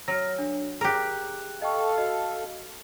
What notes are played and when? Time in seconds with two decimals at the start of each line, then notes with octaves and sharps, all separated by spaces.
0.08 F#3 F6 A#6
0.39 D4
0.81 G4 G#4 A#4 G5 F#6
1.62 A4 D#5 F5 G5 C#6
1.98 F#4 D#5